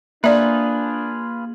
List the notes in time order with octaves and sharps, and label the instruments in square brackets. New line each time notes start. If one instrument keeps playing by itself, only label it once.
[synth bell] A#3 F#7 [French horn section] D4 [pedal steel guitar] F4 G#4 B4 [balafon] D5 E5